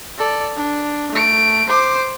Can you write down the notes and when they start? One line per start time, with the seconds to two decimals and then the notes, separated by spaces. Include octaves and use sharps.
0.18 A4 D5
0.57 D4
1.11 A3 D7
1.68 C5 D6